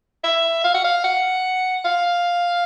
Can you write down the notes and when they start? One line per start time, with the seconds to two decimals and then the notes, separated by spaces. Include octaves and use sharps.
0.24 E5
0.64 F5
0.74 F#5
0.85 F5
1.04 F#5
1.85 F5